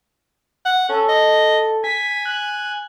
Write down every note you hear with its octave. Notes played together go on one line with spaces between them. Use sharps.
F#5
C#4 A4
D#5
G#5 B6
F#6